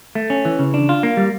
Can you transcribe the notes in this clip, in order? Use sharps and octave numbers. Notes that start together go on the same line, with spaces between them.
A3
C#4
E3
C#3
D4
F4
A#3
G3